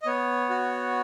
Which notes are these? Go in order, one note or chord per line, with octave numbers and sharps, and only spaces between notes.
D#5
B3 C#5
F#4